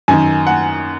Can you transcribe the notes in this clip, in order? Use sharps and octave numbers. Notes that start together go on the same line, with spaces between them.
F#2 D#3 G#5
F#5